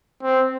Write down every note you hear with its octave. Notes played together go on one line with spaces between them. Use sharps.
C4